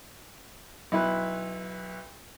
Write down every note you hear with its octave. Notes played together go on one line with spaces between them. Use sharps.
B1 E4 B4